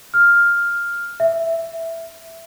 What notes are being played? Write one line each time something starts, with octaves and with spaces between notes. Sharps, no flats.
F6
E5